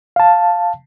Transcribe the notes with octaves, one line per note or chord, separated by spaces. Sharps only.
F5 A5